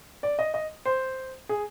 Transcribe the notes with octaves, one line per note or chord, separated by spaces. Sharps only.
D5
D#5
D#5
C5
G#4